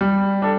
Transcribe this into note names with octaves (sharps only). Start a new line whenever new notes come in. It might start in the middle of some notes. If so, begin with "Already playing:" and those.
G3
D4 A4